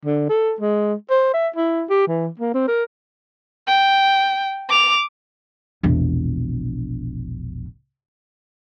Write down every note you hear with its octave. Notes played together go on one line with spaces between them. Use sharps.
D3
A4
G#3
C5
E5
E4
G4
E3
A#3
C4
A#4
G5
D6 F7
E1 A#1